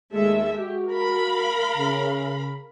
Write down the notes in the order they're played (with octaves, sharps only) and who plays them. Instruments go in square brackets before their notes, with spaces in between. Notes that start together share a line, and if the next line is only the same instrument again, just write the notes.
[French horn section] D#2 A3 [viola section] G#3 A4 E5
[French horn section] F#4 [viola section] G4
[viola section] A#4 F5 B5
[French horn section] C#3